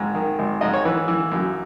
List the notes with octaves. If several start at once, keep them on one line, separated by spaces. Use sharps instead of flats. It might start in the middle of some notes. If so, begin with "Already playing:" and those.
Already playing: G#1 G#2
D#3
G#1
G#2 D#5
C#5
E3 B4
E3
F#2